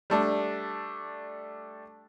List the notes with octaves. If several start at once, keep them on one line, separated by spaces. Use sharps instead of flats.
G3 A3 D4